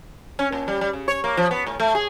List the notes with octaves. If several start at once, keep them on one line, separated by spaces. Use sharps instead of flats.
C#4
A#2
G3
G3
C#3
C#5
A#3
F3
B3
A2
A3
G#4